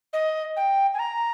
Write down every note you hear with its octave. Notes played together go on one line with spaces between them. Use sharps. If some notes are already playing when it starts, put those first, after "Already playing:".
D#5
G5
G#5
A#5